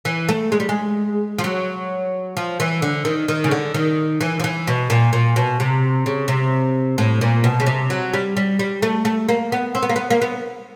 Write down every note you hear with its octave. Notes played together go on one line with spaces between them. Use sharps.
E3
A3
G#3
G3
G#3
F3
F#3
F3
E3
D3
D#3
D#3
C#3
D3
D#3
E3
F3
E3
B2
A#2
A#2
B2
C3
C#3
C3
A2
A#2
B2
C#3
C3
F#3
G3
G3
G3
A3
A3
A#3
B3
C4
B3
A#3
B3
A#3
B3